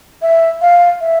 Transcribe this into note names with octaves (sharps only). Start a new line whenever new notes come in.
E5
F5
E5